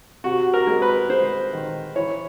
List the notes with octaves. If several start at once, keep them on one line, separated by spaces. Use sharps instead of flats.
C3 F#4
A#4
G#3
B4
G#3 C5
D#3
E3 C#5